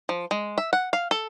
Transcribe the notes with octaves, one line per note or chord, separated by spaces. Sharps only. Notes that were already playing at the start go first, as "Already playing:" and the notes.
F3
G#3
E5
F#5
F5
A4